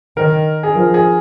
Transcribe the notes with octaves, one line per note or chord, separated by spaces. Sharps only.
D#3 A#4
G#4
F3 A#4
G#4